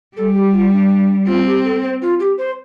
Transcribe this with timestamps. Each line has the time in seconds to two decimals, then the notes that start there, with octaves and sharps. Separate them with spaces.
0.16 G3 A4
0.34 G4
0.52 F4
0.72 D4
1.26 C4 F4
1.46 G4
1.64 A4
1.82 C5
2.02 F4
2.20 G4
2.38 C5